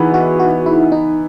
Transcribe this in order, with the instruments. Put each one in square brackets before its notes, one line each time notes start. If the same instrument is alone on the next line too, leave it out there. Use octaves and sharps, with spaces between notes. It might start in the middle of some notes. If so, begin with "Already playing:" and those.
Already playing: [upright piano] E3 B3 [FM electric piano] D#4 E4 F#4 G#4
[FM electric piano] F#4
F#4
E4
D#4